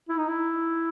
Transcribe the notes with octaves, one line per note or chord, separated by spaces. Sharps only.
E4
D#4
E4